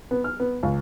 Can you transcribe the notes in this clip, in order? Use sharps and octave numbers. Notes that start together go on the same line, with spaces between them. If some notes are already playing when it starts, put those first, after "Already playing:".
B3
F6
B3
C#2